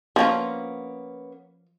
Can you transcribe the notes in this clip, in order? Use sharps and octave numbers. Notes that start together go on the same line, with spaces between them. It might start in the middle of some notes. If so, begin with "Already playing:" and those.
F3 A#3 B3 C#4 F4